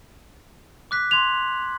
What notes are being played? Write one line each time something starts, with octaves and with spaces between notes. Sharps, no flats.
D6 F#6 B6
C6 G#6 F7 F#7